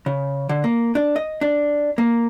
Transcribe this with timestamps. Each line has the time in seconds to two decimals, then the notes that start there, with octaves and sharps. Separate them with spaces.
0.06 C#3
0.49 D3
0.64 A#3
0.95 D4
1.16 D#5
1.41 D4
1.98 A#3